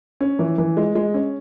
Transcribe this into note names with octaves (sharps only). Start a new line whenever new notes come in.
C#4
E3
E3
G#3
G#3
C#4